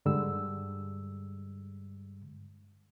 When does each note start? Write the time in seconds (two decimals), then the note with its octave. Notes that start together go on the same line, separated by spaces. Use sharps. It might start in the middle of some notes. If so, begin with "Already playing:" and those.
0.06 G2 D3 G3 G#3 E6